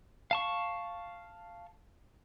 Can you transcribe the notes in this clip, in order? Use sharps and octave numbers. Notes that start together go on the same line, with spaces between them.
F5 A5 C#6